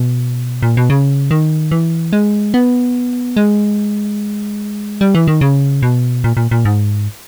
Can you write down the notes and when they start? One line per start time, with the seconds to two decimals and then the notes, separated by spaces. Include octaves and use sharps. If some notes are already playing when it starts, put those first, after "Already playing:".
Already playing: B2
0.63 A#2
0.77 B2
0.90 C#3
1.31 D#3
1.71 E3
2.13 G#3
2.54 B3
3.37 G#3
5.01 G3
5.15 E3
5.28 D#3
5.41 C#3
5.83 B2
6.24 A#2
6.37 A#2
6.51 A#2
6.65 G#2